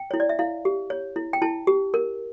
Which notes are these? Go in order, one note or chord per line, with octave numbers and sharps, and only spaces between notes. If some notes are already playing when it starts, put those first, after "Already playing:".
Already playing: G5
E4 C#5
D5
E5
E4 F5
G4
C#5
E4
G5
E4 A5
G4
A#4